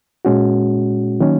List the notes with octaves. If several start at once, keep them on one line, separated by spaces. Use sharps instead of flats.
A#2 G#3 C#4 F#4
D#3 F#3 A#3 C#4